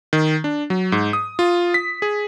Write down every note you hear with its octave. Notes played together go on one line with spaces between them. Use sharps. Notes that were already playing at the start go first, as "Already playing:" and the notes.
D#3
D4
F#3
G#2
D#6
F4
B6
G#4